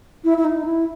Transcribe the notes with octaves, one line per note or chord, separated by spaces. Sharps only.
E4
E4
D#4
E4